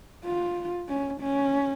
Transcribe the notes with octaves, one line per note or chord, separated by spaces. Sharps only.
F4
C#4
C#4